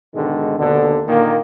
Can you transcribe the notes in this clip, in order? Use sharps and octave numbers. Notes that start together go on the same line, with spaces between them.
G#2 B2 D3 D#3 G#3
D#2 B2 D3
A#2 D3 D#3 A#3